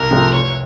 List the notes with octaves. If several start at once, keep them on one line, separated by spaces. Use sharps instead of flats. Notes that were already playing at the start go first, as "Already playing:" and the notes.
Already playing: C2 A#4
C3 F3 A3 C4
F1 C#5